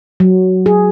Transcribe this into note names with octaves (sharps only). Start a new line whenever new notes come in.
F#3
G#4